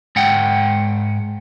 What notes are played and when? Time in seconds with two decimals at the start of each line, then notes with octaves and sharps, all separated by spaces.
0.16 G#2 F#5 G5